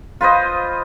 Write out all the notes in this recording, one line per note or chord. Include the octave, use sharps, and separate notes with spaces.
F4 B4 C5 D#5